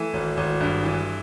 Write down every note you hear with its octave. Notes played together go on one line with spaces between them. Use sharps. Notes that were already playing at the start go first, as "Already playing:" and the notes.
Already playing: E3 A3
G#1
G#1
G2
E3